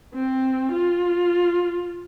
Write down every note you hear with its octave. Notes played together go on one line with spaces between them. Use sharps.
C4
F4